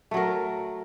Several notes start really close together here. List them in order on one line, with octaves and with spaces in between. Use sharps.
A3 F#3 A#4